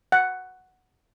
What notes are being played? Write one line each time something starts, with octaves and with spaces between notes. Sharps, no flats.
F#5